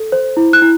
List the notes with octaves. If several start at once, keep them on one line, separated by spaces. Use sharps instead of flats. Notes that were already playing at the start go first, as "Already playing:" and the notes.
Already playing: A4
C5
E4
F#6
E4